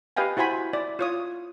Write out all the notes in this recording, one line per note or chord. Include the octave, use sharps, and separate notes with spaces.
G4 B4 D#5 F5 G5 G#5
E4 F#4 C5 G#5 B5
E4 D5
F4 C#5 D#6